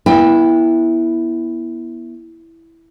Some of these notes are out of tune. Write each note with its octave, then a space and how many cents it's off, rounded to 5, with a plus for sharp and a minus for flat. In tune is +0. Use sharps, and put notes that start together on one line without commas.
B3 -25 E4 +0 G5 +30